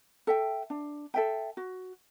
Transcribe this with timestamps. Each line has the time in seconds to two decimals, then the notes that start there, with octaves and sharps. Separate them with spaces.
0.27 A4 E5 G5
0.70 D4
1.14 A4 E5 G5
1.57 F#4